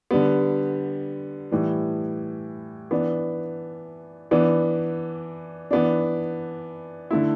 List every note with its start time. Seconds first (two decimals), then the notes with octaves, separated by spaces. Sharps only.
0.11 D3 G3 B3
1.52 A2 E3 G3
2.91 E3 B3 D4
4.31 E3 B3 D4
5.71 E3 B3 D4
7.11 D3 A3 E4